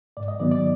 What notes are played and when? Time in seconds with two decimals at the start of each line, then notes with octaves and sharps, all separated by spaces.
0.17 G#2 D5
0.28 D#5
0.40 D#3 F#3 B3 D5
0.51 D5